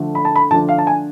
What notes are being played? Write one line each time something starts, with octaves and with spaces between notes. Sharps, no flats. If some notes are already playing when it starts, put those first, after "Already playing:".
Already playing: D3 F3 A3 D4
B5
A5
B5
D3 F3 A3 D4 A5
F5
A5
G#5